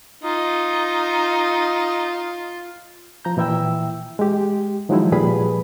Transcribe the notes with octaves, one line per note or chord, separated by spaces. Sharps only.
D#4 F4
F3 A#5 G6
A#2 E3 E4 E5 G5 E6
G#3 G4
D#3 F3 F#3 G#3 D#4 E4
A#2 F3 G3 G#4 B4 B5